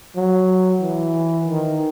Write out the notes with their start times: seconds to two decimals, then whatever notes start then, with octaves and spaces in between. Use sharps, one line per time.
0.16 F#3
0.81 E3
1.48 D#3